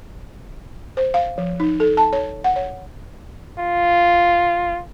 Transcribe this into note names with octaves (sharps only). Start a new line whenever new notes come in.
C5
F5
F3
D#4
A4
A5
C#5
F#5
C#5
F4